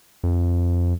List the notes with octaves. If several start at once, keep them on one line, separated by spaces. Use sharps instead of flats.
F2